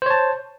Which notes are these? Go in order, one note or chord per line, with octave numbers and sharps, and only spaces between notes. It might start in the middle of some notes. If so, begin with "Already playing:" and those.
C5 C#5 A5